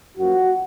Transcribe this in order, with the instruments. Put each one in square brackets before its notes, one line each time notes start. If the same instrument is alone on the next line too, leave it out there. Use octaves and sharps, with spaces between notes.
[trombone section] F#2 F3 A#3 F#4